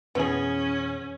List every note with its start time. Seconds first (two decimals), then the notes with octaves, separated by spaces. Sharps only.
0.15 F2 B2 E3 B3 C#4 G#4